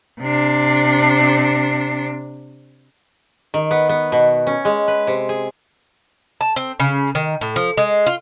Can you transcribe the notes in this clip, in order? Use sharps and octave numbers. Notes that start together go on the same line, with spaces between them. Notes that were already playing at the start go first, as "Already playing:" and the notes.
C3 D4
D#3
B3
B3
B2
C#4
G#3
B4
C3
G#4
A5
C4
C#3
D#3
A2
F3
G#3
F4